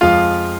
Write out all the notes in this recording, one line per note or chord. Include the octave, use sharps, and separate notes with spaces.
F2 F3 G#3 F4 F5